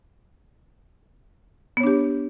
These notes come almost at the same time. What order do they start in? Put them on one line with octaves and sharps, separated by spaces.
B3 C#5 D4 G4